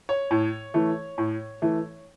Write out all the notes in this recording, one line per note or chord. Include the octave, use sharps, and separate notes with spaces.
C#5
A2
E3 A3
A2
E3 A3